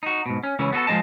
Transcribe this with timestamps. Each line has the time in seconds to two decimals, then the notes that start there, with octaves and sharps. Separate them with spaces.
0.03 D#4 F#4
0.26 G#2 B2
0.43 C#4
0.59 C#2 C#3 E3 C#4
0.73 B3 F#4 G#4 A4
0.87 F3 G#3 C4 D#5 A5